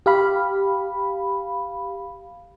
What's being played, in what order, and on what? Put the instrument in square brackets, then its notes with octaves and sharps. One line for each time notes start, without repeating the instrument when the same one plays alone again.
[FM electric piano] G4 F5 B5